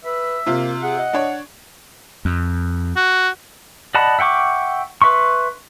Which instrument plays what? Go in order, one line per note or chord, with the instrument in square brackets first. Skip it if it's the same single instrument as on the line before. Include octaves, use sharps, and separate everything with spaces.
[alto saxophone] B4 [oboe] E5
[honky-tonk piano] C3 F4 [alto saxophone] A#3
[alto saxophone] G#4 [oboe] F#5
[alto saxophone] D#5
[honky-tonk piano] D4 C#5
[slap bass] F2
[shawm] F#4
[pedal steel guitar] D5 D#5 F#5 A5 B5
E5 F#5 G5 C#6 D6
B4 E5 C6 C#6